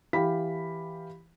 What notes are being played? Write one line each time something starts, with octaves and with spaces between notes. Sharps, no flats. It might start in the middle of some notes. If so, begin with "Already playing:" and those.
E3 G4 F5 B5 B6